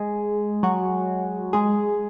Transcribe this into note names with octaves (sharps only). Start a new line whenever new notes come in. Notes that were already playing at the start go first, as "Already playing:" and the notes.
Already playing: G#3 G#4
F#3 F#4
G#3 G#4